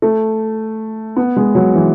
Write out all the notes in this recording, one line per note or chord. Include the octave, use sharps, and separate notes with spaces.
A3
B3
G#3
F#3
E3